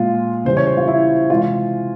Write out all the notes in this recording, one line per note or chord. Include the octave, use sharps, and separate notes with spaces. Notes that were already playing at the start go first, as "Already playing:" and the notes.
Already playing: A#2 G#3 F4
C#3 E3 G3 C5
C#5
C5
F4
E4
C3 E3 G#3 F4